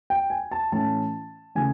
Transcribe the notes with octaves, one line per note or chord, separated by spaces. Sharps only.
G5
G#5
A5
A2 E3 A3 C#4 A5
C#3 E3 A3 G#5